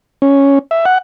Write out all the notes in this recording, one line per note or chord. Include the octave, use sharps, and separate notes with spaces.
C#4
E5
F#5